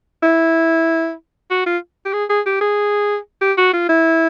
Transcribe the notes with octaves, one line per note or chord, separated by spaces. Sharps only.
E4
F#4
F4
G4
G#4
G#4
G4
G#4
G4
F#4
F4
E4